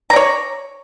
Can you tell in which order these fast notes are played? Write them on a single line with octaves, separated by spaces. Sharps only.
A#5 D5 C#5